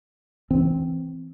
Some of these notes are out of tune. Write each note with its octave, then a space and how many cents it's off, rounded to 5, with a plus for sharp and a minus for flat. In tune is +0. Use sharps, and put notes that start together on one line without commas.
E3 +0 C4 -5